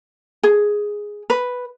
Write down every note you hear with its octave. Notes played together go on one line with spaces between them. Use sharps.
G#4
B4